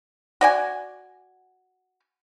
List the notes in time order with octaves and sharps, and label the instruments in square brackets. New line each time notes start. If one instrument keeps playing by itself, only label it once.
[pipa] F#4 D5 G#5